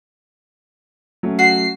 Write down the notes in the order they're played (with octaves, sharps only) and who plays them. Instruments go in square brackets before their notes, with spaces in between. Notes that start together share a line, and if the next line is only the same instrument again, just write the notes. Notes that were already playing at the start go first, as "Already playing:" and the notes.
[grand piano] F#3 A3 C#4
[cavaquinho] F#4 [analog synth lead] C7